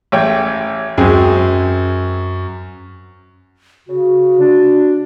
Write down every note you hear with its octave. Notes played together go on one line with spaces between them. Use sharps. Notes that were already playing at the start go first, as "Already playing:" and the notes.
A1 C#5 G5
F#2 G#3 C4 G#4
C#3 F#4
D4